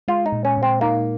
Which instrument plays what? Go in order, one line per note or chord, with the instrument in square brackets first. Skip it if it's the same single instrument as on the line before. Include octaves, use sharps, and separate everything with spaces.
[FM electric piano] G#3 [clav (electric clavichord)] F4
[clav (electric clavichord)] D#4
[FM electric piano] A#2
[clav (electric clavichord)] C#4
[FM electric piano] A#2
[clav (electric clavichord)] C4
[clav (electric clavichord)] A#3 [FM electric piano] D#4